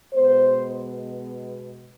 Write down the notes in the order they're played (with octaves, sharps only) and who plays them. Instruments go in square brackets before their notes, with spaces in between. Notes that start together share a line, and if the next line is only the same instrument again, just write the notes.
[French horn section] B2 G#3 B3 C5